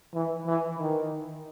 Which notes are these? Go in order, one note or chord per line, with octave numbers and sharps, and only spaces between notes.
E3
E3
D#3